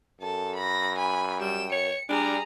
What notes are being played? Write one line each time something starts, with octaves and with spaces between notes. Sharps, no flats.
F#2 A4 A5
B5 A#6
G#5 B5
G3 G5 E7
C#5 C#7
G3 D4 G#4 A#5